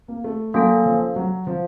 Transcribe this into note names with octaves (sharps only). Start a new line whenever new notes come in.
A#3
A3
F#3 A#3 C#4 A4
F3
F#3
F3